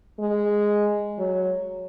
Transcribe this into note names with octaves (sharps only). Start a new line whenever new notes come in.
G#3
F#3